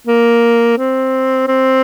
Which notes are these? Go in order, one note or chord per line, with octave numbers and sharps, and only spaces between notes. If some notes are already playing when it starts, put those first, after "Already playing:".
A#3
C4
C4